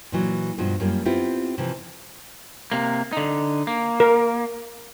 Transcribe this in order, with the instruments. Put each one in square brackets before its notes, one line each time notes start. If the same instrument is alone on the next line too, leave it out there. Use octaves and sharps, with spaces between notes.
[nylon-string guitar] A#2 E3 F#3
G2 B2 F3 F4
F#2 G3 A#3 F4
B3 C4 E4 F4 G4
C3 E3 F3
[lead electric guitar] C3 A#3
D3 D#4
A#3
[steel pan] A#4